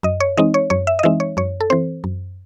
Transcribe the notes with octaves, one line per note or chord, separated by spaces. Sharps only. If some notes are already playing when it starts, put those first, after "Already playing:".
F#2 D#5
C#5
E3 G#3 C4 D#4 D#5
C#5
F#2 C#5
E5
D#5
E3 G#3 C4 D#4 E5
C#5
F#2 C#5
A4
E3 C4 C5
F#2